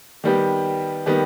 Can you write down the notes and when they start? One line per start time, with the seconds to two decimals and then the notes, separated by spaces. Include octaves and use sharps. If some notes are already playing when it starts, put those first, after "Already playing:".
0.24 D#3 G3 B3 G4
1.06 D#3 G3 B3 G4